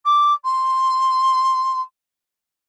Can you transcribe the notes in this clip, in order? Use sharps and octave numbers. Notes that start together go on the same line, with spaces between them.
D6
C6